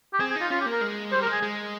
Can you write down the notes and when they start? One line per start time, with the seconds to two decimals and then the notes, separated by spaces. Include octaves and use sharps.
0.13 G4
0.20 C4 G#4
0.31 G#4
0.36 D#4 F4
0.50 C#4 F4
0.61 G4
0.66 A#3
0.71 A#4
0.81 G#3
1.12 G3 C5
1.22 A#4
1.27 G#3
1.32 G#4
1.42 G#3